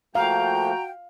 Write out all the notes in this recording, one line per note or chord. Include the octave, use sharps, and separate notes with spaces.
F3 A3 A#3 F#4 F5 G5 A#5